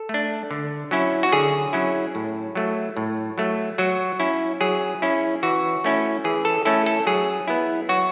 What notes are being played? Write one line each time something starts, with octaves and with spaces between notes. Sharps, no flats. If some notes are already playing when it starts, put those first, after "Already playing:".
Already playing: A4
A3 D4
D3
F#3 C#4 E4
F#4
D3 G#4
F#3 C#4 E4
A2
F#3 A3
A2
F#3 A3
F#3 F#4
C#4 E4
F#3 G#4
C#4 E4
E3 F#4
A3 C#4 E4
E3 G#4
A4
A3 C#4 E4 A4
A4
F#3 G#4
B3 E4
F#3 F#4